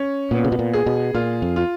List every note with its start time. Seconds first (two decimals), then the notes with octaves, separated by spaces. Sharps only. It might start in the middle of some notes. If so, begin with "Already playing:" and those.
Already playing: C#4
0.31 A#2 B3
0.44 C#3
0.52 B2
0.59 A#2
0.73 G#4
0.86 B2
1.14 A#2 F4
1.42 F2
1.56 F4